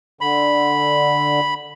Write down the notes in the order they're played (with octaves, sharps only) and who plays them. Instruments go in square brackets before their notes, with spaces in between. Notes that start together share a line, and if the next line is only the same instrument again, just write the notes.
[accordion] D3 [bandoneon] B5